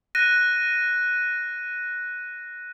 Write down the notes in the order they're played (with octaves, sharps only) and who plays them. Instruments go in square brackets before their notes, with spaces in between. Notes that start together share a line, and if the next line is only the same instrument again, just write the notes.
[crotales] F#6 A#6 D#7